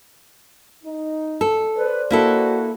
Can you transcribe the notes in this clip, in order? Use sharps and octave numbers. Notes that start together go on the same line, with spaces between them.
D#4
A4
B4 C5 D5
A#3 E4 F#4 A4